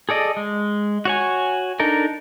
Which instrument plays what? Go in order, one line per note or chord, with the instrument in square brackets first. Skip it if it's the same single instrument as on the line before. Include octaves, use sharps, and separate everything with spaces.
[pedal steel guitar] G#4 A4 D5 D#5
G#3
F#4 C#5 G#5
D4 D#4 A4 A#4